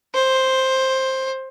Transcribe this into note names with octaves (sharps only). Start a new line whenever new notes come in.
C5